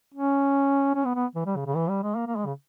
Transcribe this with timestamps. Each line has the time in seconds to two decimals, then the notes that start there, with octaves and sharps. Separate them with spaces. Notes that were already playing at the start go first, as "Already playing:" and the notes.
0.14 C#4
0.95 C#4
1.05 B3
1.15 B3
1.36 E3
1.46 G3
1.56 C#3
1.66 C#3
1.76 E3
1.89 G3
2.03 G#3
2.16 A#3
2.27 A#3
2.36 G#3
2.46 C#3